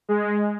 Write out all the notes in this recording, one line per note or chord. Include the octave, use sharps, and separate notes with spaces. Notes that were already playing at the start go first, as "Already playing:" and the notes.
G#3